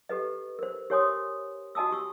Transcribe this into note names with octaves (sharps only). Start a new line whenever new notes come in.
G4 A4 B4 D#5
A#4 C5
G4 A#4 C#5 G#5 C6 D#6
F#4 D#5 G#5 A5 D#6 E6
G4 C#6 E6